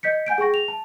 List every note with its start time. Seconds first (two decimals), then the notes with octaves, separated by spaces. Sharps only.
0.03 D#5 G6 B6 C#7
0.27 F#5 G#5 G6 D7
0.38 G#4 G5 C#6 A#6
0.54 F7
0.68 A5